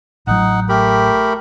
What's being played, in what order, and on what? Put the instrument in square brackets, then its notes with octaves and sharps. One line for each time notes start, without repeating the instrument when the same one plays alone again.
[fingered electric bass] A1 F#3 [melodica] D#4 F#5
[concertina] A3 A#4 B5 [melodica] G4